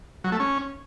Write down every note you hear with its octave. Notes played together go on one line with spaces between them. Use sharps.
F#3
A3
C#4